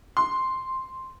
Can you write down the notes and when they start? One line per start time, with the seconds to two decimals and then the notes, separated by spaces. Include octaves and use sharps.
0.17 C6